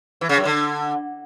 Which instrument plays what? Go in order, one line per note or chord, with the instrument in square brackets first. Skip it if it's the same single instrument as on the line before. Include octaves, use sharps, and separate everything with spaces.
[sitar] E3
C#3
F#2
D3